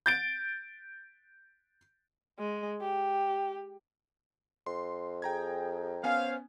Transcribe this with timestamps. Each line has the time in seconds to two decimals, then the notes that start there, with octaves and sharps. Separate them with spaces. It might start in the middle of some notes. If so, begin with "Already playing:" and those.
0.06 G6 A6 D7
2.39 G#3
2.81 G4
4.66 F2 C6
5.22 G#4 G5 A#5 G#6
6.04 B3 C#4 C5 F5 G#5